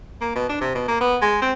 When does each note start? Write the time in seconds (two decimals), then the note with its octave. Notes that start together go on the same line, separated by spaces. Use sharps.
0.21 A#3
0.35 B2
0.50 D4
0.61 C3
0.75 B2
0.88 A#3
1.01 B3
1.22 G#3
1.42 C4